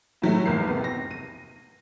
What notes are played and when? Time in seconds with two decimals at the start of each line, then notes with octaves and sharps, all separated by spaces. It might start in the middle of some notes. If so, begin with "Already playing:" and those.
0.22 A2 F#3 G3 A3
0.46 F1 E2 A#4 C7
0.67 C3 B3
0.84 A#6
1.11 D#7